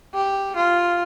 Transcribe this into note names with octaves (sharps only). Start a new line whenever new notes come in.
G4
F4